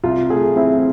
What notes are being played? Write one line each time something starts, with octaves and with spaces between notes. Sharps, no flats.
C2 F4
A3 G#4
C4 E4